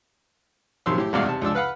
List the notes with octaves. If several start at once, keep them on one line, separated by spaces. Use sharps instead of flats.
A#1 C3 D#3 F#3 C6 E6
A2 G4
G#1 E2 G2 B2 D5 F5
C3 A5
C#2 F3 D4 E6
B4 F5 F#5 B5